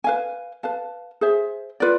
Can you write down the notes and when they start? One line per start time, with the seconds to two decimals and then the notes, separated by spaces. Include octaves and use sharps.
0.04 B4 F5 G#5
0.63 B4 F5 A5
1.21 G#4 C5 E5
1.80 F4 B4 D5